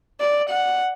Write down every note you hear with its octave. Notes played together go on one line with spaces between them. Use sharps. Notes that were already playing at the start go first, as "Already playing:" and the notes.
D5
F#5